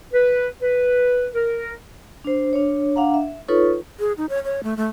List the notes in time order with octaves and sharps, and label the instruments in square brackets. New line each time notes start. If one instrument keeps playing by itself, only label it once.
[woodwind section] B4
B4
A#4
[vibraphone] D4 C5
D4 C#5
D4 F5 F#5 A#5
E5
D#4 F4 A4 B4 C#5 C#6
[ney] G#4
D#4
C#5
C#5
A3
A3